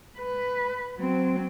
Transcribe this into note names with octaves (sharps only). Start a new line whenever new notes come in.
B4
F#3 C4